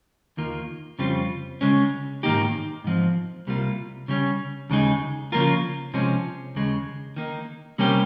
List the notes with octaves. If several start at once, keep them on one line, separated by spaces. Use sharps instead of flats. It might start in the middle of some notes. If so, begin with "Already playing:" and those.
D#2 D#3 A#3 F4
F2 C#3 G3 C4 F4
C#3 G#3 C#4
G#2 D#3 A#3 D#4 G4
G#2 F3 C4
C2 C3 G3 A#3 F4
C#3 G3 C#4
D#2 C#3 G#3 D#4 G#4
C#3 F3 A#3 F4 A#4
C3 F3 G#3 C#4
D#2 C#3 G#3
D#3 A#3 D#4
C3 G3 A#3 C#4 G4